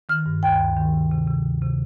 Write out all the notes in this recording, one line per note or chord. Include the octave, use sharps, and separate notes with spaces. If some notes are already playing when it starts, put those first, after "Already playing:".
D#3 F6
G2
D2 G5
D2
D#3
C3
C3
C3
D2
C3